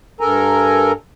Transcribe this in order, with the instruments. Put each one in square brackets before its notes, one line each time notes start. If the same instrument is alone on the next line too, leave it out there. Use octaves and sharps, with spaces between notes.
[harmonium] G2 A4 A#4 G#5 A#5